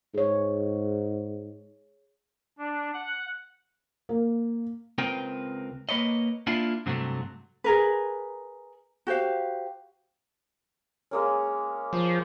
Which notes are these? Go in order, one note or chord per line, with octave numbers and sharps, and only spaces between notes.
G#2 G#4 C#5
D4
F#5
A#3
C#2 C4 A#4 B4 G5
A#3 B4 C#5 D#5
A#3 D4 E4 F4
G2 C3 F#3 G3 A3
G#4 A#4 B4
F#4 G4 C5 F5
G#3 A#3 C#4
F3